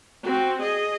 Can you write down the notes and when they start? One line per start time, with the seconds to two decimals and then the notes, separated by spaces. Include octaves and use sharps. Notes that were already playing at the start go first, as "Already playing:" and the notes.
0.23 C4 F#4
0.62 G#4 D#5